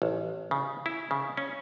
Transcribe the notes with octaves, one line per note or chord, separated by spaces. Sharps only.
A1
C#3
E4
C#3
C#4